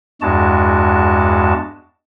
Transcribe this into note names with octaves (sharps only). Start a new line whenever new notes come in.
E2 G2 G#3 F#4 A5